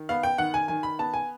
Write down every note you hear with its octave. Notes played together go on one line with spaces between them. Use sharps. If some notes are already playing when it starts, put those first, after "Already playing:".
Already playing: D#3
B3 F5
G5
D#3 F#5
G#5
D#3 G#5
B5
B3 A5
G#5